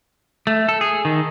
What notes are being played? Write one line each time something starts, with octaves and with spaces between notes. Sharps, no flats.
A3
A4
G#4
D#3